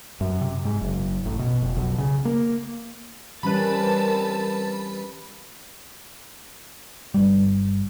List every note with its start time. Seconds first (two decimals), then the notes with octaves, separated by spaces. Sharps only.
0.21 F#2
0.41 C3
0.65 G#2
0.81 F#1
1.26 A1
1.39 B2
1.62 F1
1.76 B1
1.98 C#3
2.25 A#3
3.43 E3 G3 C4 C#4 A#4 B4 A5 B5
7.14 G1 G3